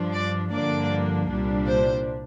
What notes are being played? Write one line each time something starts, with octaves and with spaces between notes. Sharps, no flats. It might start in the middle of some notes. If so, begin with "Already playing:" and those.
Already playing: G2 F3 D4
D5
G2 D3 F3 A#3 D4 D5
C2 A#2 G3 D4
C5